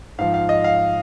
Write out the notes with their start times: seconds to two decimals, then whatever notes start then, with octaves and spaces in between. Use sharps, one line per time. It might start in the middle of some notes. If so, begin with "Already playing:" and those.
0.18 G#2 F3 F5
0.34 F5
0.49 D#5
0.64 F5